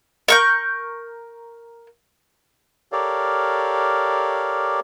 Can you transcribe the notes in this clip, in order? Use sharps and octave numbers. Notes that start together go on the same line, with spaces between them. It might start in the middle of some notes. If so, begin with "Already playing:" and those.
A#4 C#6 G6
G4 A4 A#4 C#5 D5 F5